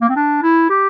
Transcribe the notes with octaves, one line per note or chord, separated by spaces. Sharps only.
A#3
C4
D4
E4
G4